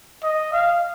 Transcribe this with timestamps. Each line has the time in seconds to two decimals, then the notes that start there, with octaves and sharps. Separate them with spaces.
0.23 D#5
0.53 F5